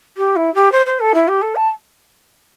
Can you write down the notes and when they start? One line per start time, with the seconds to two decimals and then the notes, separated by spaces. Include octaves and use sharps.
0.16 G4
0.36 E4
0.54 G4
0.71 C5
0.86 C5
0.99 A4
1.14 E4
1.27 G4
1.41 A4
1.55 A5